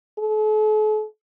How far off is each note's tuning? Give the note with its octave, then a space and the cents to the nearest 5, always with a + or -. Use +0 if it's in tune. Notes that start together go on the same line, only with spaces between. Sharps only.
A4 -45